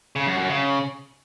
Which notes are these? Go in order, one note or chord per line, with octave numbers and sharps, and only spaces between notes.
C#3
F#2
F#2
C#3